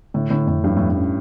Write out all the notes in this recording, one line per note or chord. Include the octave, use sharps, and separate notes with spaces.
A2 D3
A2 D3
F2 A2
G2 F3
A2
F2
A2
C#4